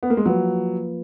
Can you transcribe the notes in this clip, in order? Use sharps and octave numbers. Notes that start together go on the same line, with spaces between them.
B3
A#3
G#3
F3 F#3 A#3 F4 B4